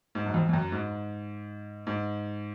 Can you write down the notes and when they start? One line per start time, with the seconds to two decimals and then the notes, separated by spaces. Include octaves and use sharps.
0.15 G#2
0.26 F#2
0.34 F2
0.49 F2
0.53 F#2
0.72 G#2
1.87 G#2